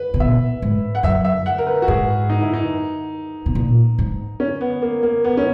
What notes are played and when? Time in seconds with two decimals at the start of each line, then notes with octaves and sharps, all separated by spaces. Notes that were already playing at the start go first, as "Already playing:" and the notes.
Already playing: B4
0.14 A#2
0.20 B2 E5
0.62 G#2
0.95 F#5
1.03 F#2 E5
1.25 E5
1.46 F#5
1.58 A#4
1.67 B4
1.82 F#4
1.88 G#2 G#4
2.30 D#4
2.42 E4
2.54 D#4
3.46 B2
3.55 A#2
3.99 G#2
4.40 C#4
4.61 B3
4.82 A#3
5.03 A#3
5.24 B3
5.37 C#4